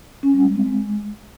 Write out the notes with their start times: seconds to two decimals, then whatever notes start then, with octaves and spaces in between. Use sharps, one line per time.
0.23 C#4
0.34 G3
0.45 G#3
0.55 C4
0.66 G#3